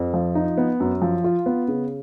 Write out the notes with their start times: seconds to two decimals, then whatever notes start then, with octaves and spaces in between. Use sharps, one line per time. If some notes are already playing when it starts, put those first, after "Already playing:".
Already playing: F2
0.14 F3
0.35 D#4
0.58 B3
0.80 F#2
1.02 F3
1.24 F4
1.46 B3
1.68 C#3